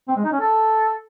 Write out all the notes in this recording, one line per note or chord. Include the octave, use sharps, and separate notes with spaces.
C4
G#3
D#4
C#4
A4